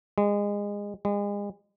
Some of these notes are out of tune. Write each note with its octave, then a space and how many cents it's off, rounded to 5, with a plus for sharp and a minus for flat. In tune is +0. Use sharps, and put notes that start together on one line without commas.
G#3 -25
G#3 -35